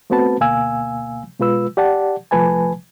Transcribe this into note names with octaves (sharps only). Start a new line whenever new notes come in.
A3 B3 C4 F#4 B4 A5
D2 B2 A#3 F5 G#5 E6
B2 G#3 F4 B4 E6
G4 D5 F#5 A5
C2 F3 A3 B4 G#5 A5